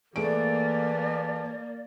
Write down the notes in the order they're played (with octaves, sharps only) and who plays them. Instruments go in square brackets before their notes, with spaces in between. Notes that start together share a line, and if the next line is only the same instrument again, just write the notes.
[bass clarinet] E3 [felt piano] A3 G#4 D7 [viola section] A#3 [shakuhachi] D5